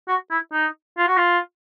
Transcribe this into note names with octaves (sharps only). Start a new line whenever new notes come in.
F#4
E4
D#4
F4
F#4
F4